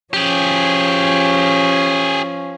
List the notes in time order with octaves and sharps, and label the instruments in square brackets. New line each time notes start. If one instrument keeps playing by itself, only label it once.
[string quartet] F3 C#4 [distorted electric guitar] G4 G#4